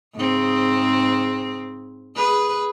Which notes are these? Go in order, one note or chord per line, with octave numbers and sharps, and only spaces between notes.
G#2 C#3 C4
G#4 B4